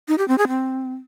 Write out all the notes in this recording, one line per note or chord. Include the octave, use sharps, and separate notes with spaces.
D#4
G4
C4
G#4
C4